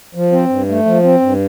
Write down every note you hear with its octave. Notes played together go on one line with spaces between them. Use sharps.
F3
C4
G2
A3
F3
C4
G2